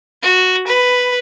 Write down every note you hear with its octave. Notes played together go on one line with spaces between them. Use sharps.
F#4
B4